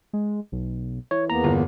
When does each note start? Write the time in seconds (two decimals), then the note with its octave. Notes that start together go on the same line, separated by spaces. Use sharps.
0.13 G#3
0.52 B1
1.11 E3 C#5
1.30 E2 A#3 B3 A#5
1.44 G1